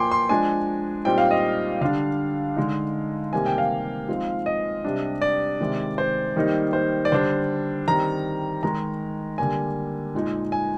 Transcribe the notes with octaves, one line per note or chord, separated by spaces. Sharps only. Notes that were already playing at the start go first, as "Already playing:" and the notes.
Already playing: A#2 F3 A#3 G5 G#5 C6 D6
C6
F3 G#3 D4 G#5
A#2 G3 C4 D#4 G5
F5
D#5
D3 G3 D4 F5
D3 G#3 D#4
C3 D#3 G3 A#3 G#5
G5
F5
F3 G#3 C4 D#4
D#5
C3 G3 D4
D5
C3 D#3 G#3
C5
D#3 G3 A#3 D#4
C5
D5
D3 G3 D4 C5
D#3 G3 C4 A#5
D#3 G#3 D#4 A#5
D3 G3 A#3 G#5
A#2 G#3 D#4
G#5